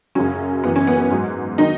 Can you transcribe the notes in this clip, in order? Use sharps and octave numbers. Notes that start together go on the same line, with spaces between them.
F#2 C#3 F#3 C#4
F#2 E3 B3
C#4
B3
B3
G#2 F#3
D#3 F#3 D#4